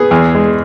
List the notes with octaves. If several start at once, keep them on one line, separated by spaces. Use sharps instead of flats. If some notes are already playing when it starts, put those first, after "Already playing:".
Already playing: B3 G#4
E2
G#3